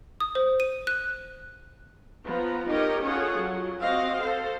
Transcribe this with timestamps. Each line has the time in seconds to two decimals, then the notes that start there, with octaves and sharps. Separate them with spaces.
0.20 D#6
0.35 C5
0.60 D#7
0.87 F#6
2.27 F3 B3 A#5
2.69 D#4 G4 A#4 C#5 D#5
3.03 C#4 F4 G#4 A4 C#5 F#5
3.39 F#3
3.81 C4 F#4 D#5 F5
4.22 A4 C5